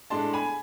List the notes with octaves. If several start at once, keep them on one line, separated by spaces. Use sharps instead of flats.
A2 G#3 D4 A5 C6
G#5 B5